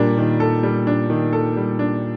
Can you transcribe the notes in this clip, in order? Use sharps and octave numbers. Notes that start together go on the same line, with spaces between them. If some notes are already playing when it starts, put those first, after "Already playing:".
Already playing: A#2 G3 D4
D#3
A4
G3
D4
D#3
A4
G3
D4